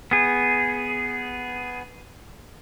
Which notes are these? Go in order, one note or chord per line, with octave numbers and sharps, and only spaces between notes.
B3 G#4